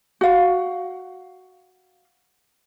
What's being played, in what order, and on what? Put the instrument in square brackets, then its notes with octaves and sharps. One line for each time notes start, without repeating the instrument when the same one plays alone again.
[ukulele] F#4 F5